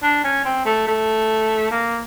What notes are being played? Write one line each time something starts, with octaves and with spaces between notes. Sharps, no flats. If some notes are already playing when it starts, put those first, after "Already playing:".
D4
C#4
C4
A3
A3
A#3